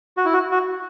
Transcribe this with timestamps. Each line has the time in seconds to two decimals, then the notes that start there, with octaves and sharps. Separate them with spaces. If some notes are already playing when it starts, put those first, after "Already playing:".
0.17 F#4
0.25 E4
0.34 F#4
0.52 F#4